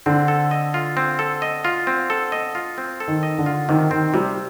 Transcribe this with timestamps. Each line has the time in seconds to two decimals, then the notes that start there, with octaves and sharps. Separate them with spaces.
0.06 D3 C4
0.28 A4
0.51 D#5
0.74 F4
0.97 C4
1.19 A4
1.42 D#5
1.65 F4
1.87 C4
2.10 A4
2.32 D#5
2.55 F4
2.78 C4
3.00 A4
3.08 D#3
3.23 D#5
3.39 D3
3.46 F4
3.69 C3 D#3
3.91 D#3 C4
4.14 C3 G3